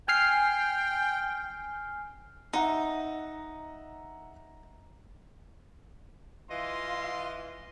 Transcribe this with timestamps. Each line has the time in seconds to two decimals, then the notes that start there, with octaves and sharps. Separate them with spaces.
0.08 G5 G#5 F6 C7
2.53 D#4 E5 F#5 A#5
6.51 E3 F4 D#5 F5 C6